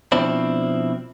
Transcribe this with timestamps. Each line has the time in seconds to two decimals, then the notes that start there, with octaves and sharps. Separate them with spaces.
0.12 B2 F3 C4 D4 E4